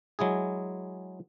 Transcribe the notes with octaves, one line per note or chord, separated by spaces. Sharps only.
F#3 G#3 E4 G#4